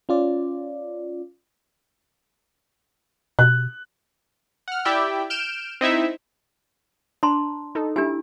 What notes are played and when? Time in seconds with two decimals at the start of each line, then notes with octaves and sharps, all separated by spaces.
0.09 C#4 F4 D5
3.39 B2 F#6
4.68 F#5 F6
4.85 E4 G4 D5 E5 G5
5.30 F6 G6 D7 E7
5.81 C4 D#4 E4 E5
7.23 D4 A5 A#5 C6
7.75 D#4 A4
7.96 D4 E4 G4 G#5